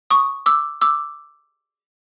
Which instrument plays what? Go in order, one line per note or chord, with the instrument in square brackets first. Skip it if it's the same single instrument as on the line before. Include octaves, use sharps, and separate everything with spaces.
[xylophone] C#6 D#6
D6 E6
D6 E6